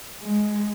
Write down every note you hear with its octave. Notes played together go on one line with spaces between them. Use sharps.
G#3